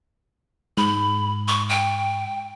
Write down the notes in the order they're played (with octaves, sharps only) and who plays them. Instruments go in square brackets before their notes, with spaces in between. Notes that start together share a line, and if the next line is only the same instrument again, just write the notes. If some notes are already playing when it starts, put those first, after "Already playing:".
[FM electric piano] G#2 [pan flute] B5
[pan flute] C#6
G5